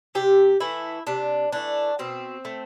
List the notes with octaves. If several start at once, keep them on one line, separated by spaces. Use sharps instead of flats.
C3 G4
E3 A3 E4
C3 D4
E3 A3 D4
B2 C4
A3